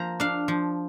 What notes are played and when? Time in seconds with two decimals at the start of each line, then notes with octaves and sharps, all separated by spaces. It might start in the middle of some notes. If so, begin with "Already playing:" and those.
Already playing: F3 A#3 A#5
0.20 D4 F5
0.48 F3